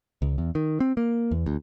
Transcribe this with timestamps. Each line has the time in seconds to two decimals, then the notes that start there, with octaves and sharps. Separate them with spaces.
0.22 C#2
0.38 E2
0.55 D#3
0.80 C4
0.97 A#3
1.31 E2
1.46 D2